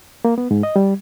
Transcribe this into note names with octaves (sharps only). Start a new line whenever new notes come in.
A#3
B3
G#2
D#5
G3